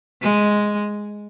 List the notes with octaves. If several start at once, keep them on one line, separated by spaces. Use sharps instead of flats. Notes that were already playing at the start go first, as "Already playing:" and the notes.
G#3